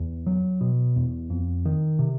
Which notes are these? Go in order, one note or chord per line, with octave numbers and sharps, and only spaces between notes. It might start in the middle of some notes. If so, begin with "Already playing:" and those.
Already playing: E2
F#3
B2
E2
F2
D#3
C3